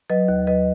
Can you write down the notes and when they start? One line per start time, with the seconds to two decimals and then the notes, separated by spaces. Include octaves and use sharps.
0.10 F#3 B4 D#5
0.28 D#2
0.47 F#3 B4 D#5